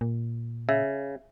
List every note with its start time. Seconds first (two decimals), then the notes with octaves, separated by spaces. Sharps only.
0.01 A#2
0.69 C#3 E5